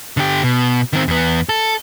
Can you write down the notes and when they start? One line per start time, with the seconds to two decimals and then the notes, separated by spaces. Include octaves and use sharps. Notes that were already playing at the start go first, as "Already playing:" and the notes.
0.17 D3 G4
0.43 B2
0.93 D#3 C4
1.08 E2 B3
1.49 A4